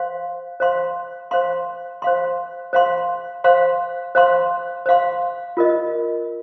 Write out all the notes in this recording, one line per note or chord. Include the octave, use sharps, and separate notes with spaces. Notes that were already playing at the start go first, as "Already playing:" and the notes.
Already playing: C5 F5 C6
C5 F5 C6
C5 F5 C6
C5 F5 C6
C5 F5 C6
C5 F5 C6
C5 F5 C6
C5 F5 C6
F4 A#4 D#5